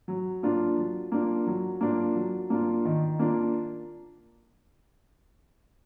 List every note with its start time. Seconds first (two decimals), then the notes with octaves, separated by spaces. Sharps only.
0.08 F#3
0.43 A#3 D4 F4
0.78 F#3
1.12 A#3 D4 F4
1.47 F#3
1.81 A#3 D4 F4
2.16 F#3
2.50 A#3 D4 F4
2.85 D#3
3.19 A#3 D4 F4